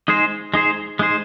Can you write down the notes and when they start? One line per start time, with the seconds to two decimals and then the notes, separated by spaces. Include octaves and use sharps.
0.08 G#3 D#4 G#4 C5
0.54 G#3 D#4 G#4 C5
0.99 G#3 D#4 G#4 C5